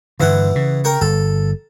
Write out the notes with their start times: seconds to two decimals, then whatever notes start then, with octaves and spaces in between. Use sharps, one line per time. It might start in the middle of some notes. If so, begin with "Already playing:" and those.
0.20 G2 D3 E3 E4 F#5
0.55 C#3
0.84 A#4 G5 C#6
1.01 G1 A4